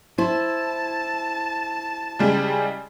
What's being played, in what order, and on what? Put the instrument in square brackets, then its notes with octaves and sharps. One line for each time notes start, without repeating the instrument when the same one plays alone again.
[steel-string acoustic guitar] E4 C5 [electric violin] A5
[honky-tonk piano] C#3 G3 G#3